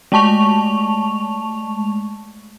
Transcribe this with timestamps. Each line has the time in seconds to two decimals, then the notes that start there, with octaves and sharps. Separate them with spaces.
0.12 G#3 A3 A5 C#6 F7